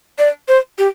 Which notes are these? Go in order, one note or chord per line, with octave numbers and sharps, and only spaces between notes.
D5
C5
G4